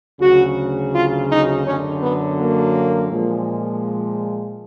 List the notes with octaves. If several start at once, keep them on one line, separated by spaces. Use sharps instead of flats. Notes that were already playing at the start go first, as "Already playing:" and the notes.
D2 C#3 F#3 F#4
F4
D#4
F#2 D3 F#3 C#4
B3
A#3
A#2 F3 G#3